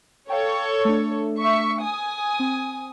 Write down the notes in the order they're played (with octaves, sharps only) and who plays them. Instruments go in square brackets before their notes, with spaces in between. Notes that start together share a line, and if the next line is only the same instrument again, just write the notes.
[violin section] A4 C#5 [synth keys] F5 G5
[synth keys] A3 D4
[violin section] E5 C#6
G#5 D#6
[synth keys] C4